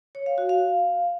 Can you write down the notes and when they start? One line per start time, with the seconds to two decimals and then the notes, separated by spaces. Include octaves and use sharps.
0.15 C#5
0.26 F5
0.38 F#4
0.49 F5